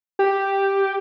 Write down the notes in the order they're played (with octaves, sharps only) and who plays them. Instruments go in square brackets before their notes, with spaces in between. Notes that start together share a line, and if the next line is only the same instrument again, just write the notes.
[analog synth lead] G4